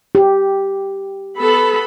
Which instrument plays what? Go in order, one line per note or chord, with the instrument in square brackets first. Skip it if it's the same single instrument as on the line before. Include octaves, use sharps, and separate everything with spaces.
[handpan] G4
[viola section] B3 A4 B5